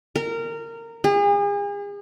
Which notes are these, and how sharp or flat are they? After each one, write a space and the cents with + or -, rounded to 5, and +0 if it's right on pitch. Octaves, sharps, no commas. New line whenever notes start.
A#4 -20
G#4 -40